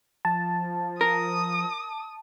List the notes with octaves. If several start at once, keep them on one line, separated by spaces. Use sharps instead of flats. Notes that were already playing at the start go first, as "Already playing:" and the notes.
F3 A5
A#4 D#6